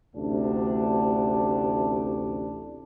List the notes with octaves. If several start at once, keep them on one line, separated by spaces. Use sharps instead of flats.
A1 D2 C3 A3 D4